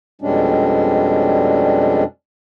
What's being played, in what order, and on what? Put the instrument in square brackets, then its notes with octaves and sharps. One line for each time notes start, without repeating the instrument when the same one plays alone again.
[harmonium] F2 B2 G3 G#3 C#4 D4